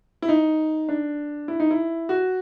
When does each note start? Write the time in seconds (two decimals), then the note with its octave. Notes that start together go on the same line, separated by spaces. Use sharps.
0.22 E4
0.28 D#4
0.89 D4
1.48 E4
1.60 D#4
1.71 E4
2.09 F#4